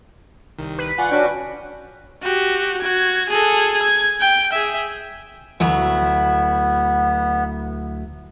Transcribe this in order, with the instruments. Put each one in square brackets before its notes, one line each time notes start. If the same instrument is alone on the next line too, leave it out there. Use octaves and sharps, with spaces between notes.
[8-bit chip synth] C2 D#3
[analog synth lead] B4
[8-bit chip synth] F4 D5 C#6 [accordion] F#5 [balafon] G#5
[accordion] C#4 D4 F#4 [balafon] D5 [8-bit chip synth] G5 C#6 D6
[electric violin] F#4 G4
F#4 G#6
G#4 A4
G#6
G5
G#4 E5
[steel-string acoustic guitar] D2 F#3 E4 [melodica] B3